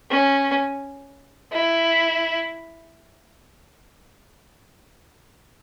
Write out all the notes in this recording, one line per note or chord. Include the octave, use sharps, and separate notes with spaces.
C#4
E4